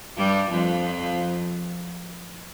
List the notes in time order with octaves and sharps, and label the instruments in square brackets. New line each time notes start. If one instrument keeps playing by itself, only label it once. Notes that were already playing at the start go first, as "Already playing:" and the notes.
[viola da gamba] G2 G3
F2 F3